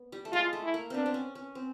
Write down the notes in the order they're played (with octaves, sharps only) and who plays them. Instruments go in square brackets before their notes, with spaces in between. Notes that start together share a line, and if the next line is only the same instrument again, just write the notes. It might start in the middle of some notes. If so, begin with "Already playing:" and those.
Already playing: [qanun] B3
G3
A3
[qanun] G#3 [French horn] F4
[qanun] A3
[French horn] E4
[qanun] A#3
[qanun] B3 C4 [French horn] D4
[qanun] C4
C#4
C#4
C4